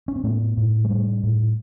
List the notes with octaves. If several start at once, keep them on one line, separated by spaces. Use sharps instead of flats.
C#4
C4
A2 A3 B3
A2
G#3
A2 G3 A3
A2